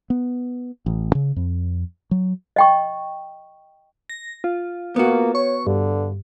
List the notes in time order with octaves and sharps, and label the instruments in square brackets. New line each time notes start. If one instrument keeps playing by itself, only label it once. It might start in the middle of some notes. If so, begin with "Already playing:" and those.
[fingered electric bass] B3
A1
C#3
F2
F#3
[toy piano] D#5 G5 C#6
[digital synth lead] A#6
F4
[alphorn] A#3 [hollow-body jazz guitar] B3 F#4
[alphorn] C#5 [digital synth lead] C#6
[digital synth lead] G2 [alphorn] D3